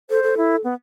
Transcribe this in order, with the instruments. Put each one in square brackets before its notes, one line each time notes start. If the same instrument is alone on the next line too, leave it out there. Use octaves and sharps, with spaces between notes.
[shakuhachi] A4 [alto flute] C5
[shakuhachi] A4
[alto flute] E4
B3